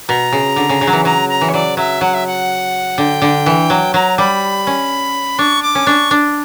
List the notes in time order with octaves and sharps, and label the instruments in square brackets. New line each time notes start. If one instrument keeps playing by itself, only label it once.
[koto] B2 [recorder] A#5
[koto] C#3
D3
C#3
C#3
F#3
E3
[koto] F#3 [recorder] A#5
[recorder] A#5
[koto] E3
[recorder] C#5
[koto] F#3 [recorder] D5
[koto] F#3 [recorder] E5
[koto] F#3 [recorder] F#5
[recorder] E5
F#5
[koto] D3 [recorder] G5
[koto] D3
E3
F#3
[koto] F#3 [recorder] A#5
[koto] G3 [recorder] B5
[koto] C#4
[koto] D4 [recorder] C#6
[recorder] D6
[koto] C#4
[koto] D4 [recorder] C#6
[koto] D4